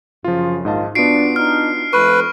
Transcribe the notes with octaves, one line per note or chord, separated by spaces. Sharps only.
F#2 C#3 F3 F4
A#1 G#2 D#3 F4 D#5 A5
B3 D4 F4 F#4 C7 D7
D4 D#4 F6
F2 A3 B4 C#6